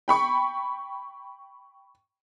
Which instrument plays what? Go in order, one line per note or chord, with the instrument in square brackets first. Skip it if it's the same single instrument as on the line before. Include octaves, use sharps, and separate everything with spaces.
[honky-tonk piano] G5 B5 C#6